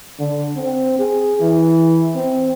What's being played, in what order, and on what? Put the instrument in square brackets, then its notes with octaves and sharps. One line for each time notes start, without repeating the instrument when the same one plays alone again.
[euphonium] D3
C4
G#4
E3
C4